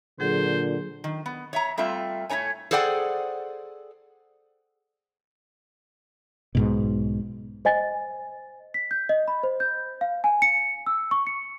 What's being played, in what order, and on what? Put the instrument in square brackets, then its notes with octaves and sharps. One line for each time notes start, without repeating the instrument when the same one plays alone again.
[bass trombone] A#2 [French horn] D3 [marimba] F#3 G#4 [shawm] C5
[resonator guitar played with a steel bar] D#3
B3
C#5 E5 A#5
G3 A3 C4 F4 E5
A2 A3 D#4 C#5 G#5
G#4 A4 C5 D5 F#5 G5
[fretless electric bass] B1 G#2 B2
[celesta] C5 D#5 G#5 A6
B6
G6
D#5
B5
C5
G6
F5
G#5
C#7
E6
C#6
C#7